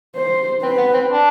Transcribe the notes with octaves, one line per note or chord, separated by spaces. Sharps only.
C5
C4 B4
B3
C4
D4